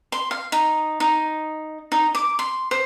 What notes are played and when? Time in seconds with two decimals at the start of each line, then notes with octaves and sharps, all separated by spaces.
0.12 C6
0.31 F5
0.52 D#4
1.00 D#4
1.92 D#4
2.15 D6
2.39 C6
2.71 C5